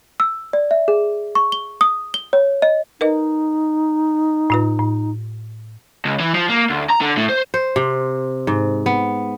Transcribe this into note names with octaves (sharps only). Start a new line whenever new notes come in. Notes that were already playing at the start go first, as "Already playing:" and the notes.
E6
D5
E5
G#4
C#6
G7
D#6
G7
C#5
D#5
D#4 A#4 B4 D#5
A2 F4 B4
A2
C#2
E3
F3
A#3
D2
A#5
D3
A2
C5
C5
C3
G#2
B3